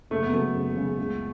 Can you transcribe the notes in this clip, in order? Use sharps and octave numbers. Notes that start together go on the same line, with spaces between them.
F#1 A3
B3
F#2 C#3 F#3 A3
F#1
F#2 C#3 F#3
C#2